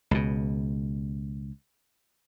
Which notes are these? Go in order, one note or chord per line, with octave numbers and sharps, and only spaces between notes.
C#2 B2